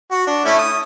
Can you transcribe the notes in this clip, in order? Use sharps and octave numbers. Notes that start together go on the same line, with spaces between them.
F#4
D4
A3 C#4 E4
D#6